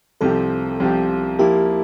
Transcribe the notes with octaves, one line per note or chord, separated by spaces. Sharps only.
C2 C3 F3 C4 G4 A4
C2 C3 F3 C4 G4
F3 A#3 E4 G4 A#4